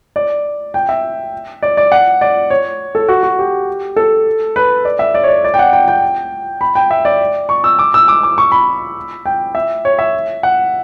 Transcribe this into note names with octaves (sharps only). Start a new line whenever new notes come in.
D5
G5
E5
D5
D5
F#5
D5
C#5
A4
F#4
F#4
G4
A4
B4
D5
E5
D5
C#5
D5
D5
G5
F#5
G5
G5
B5
G5
E5
D5
C#6
E6
D6
E6
D6
D6
C#6
B5
G5
E5
C#5
E5
F#5